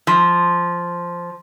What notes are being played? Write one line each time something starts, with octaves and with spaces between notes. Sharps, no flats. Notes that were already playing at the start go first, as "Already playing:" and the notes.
F3